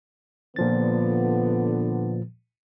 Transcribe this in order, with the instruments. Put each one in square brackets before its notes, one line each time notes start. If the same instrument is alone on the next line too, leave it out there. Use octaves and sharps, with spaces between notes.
[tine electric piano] A#2 F3 A6 [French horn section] D3 B3